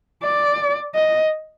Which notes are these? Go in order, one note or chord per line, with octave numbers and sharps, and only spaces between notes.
D5
D#5